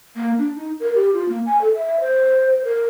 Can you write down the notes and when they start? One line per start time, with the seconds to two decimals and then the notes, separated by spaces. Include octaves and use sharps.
0.16 A#3
0.38 D4
0.55 D#4
0.80 A#4
0.95 G4
1.13 F4
1.29 A#3
1.46 G#5
1.61 A4
1.74 E5
2.00 C5
2.64 A#4